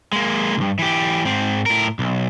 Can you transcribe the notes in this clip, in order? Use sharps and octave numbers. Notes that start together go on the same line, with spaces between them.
G#3 A#3
C2 G2
E3 G4
G#2 C4
A2 A#4
B1